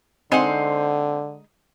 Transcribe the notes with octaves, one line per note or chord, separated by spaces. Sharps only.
D3 G#3 C4 D#4 C5 F#5